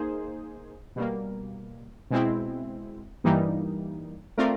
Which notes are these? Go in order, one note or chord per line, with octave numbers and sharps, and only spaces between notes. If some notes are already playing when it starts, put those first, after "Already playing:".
Already playing: A#3 D#4 G#4 C5
B2 G3 A#3
B2 G#3 C4 E4
G2 E3 G3 A#3 D#4
A3 C4 F4 A#4 D5